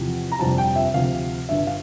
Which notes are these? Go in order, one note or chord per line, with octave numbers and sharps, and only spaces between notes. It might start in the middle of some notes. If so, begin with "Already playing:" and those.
Already playing: E2 C3 F3
A#5
G1 F2 C3 G3 A5
G5
E5
D2 C3 F3 F5
G1 G2 D3 E5
F5